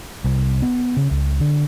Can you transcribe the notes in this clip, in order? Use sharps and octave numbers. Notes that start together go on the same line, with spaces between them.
C2
B3
C#3
C#2
D3